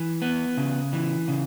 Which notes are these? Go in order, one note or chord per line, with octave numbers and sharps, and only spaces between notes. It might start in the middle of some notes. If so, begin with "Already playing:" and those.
Already playing: E3
B3
C#3
E3
C#3